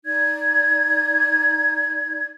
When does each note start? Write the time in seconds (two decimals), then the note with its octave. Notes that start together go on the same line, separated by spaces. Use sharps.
0.05 D#4 D5 G#6